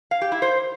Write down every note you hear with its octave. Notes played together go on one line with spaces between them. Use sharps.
F5
G4
E4
C5